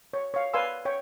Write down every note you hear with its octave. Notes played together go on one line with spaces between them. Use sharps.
C#5
C#5 F5
B4 D5 F5 G#5 C6 E6
C#5 G5